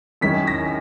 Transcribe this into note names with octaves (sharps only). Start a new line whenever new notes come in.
F#2 D#3 G#3 C#4 E4 B6
A#6